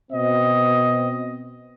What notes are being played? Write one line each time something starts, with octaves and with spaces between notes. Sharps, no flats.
B2 C4 D#5